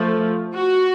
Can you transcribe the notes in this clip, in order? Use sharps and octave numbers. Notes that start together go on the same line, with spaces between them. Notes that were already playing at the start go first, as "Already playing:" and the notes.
Already playing: F3 A3
F#4